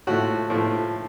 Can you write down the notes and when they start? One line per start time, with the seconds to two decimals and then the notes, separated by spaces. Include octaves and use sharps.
0.07 A2 F3 A3 F#4
0.50 A2 F3 A3